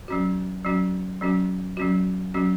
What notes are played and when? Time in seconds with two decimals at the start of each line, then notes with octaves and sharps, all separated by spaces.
0.08 F#3 C#4 F#4
0.65 F#3 C#4 F#4
1.21 F#3 C#4 F#4
1.77 F#3 C#4 F#4
2.34 F#3 C#4 F#4